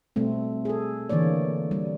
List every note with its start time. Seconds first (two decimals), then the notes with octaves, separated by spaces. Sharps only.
0.16 B2 G3 A3 C4
0.65 G#4 A4
1.09 D3 E3 A#3 C#5 D5
1.71 G3